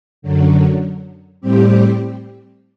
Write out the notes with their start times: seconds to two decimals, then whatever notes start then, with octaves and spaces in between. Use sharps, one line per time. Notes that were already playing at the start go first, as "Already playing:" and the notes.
0.22 F#2 D3 F#3
1.41 A2 G3 C4 G4